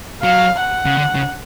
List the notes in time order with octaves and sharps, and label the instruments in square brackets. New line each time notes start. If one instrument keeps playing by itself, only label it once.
[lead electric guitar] F#3 [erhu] F5
[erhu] F#5
[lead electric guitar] C#3
D3
C#3